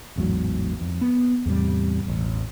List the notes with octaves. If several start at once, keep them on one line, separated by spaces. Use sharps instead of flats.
A1 E2 G#2 F#3
F2
B3
E2 A2 C3 G3
E1 A1